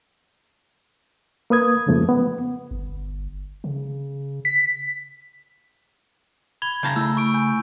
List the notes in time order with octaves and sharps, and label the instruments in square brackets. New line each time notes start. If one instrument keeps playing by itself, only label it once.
[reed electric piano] A#3 B4 D#6 G#6
F2 G#2 C#3 F3 A3 A#3
B3
[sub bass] G1
C#3
[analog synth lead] B6
[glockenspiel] B5 F7 G7 [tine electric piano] G#6
[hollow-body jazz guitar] C#3 A5 A#5 [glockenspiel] G6
[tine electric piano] A3 E4 [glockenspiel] E6
[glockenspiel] C#6 D7
G#5 G6